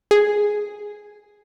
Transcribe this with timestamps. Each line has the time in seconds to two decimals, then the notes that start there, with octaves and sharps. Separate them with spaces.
0.11 G#4